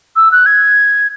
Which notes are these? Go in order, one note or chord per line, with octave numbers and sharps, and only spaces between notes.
E6
F#6
G#6